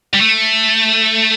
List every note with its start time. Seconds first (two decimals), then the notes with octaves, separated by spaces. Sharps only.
0.14 G3
0.21 A3